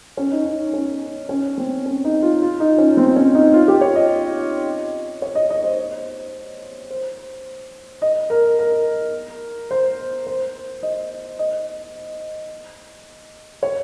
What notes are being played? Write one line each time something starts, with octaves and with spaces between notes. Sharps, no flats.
C#4
D#4
D#4
C#4
C#4
C4
C#4
D#4
F4
F4
D#4
C#4
C4
C#4
D#4
F4
G4
C#5
D#5
C#5
D#5
D#5
C5
C5
D#5
A#4
A#4
C5
C5
D#5
D#5
C#5